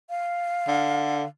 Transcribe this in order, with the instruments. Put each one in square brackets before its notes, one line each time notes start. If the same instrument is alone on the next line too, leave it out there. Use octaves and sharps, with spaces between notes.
[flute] F5
[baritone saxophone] D3